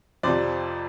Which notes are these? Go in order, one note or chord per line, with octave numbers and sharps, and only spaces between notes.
F2 C3 F3 C5 D5